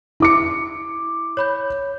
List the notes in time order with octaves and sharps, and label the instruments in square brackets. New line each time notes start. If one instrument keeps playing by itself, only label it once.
[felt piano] E4 D6 C#7
[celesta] C#5 B5 G6